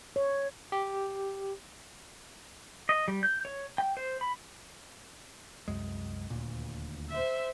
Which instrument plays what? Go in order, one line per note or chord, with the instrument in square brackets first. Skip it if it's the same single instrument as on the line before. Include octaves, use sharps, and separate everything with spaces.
[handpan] C#5
[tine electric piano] G4
[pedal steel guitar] D#5
G3
G6
C#5
G5
C5
B5
[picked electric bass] C2 F#2 G#3
D#1 D2 A#2
[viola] C5 E5